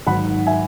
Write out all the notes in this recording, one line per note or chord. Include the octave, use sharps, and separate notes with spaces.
G#1 G#2 F#3 F#5 B5
E5 G#5